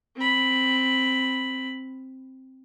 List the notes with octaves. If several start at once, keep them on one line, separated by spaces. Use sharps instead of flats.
C4 B5